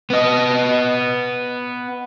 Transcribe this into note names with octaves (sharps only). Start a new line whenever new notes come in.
B3 D#5